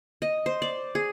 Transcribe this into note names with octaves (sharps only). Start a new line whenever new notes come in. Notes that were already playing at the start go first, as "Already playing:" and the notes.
D#5
C5
D5
G#4